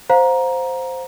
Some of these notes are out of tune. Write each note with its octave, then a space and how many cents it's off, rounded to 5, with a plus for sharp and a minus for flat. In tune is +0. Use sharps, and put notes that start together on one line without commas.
C5 +0 F5 +30 A#5 +15